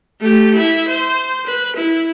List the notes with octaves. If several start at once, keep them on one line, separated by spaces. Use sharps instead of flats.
A3 G4
E4 E5
C5
B4
E4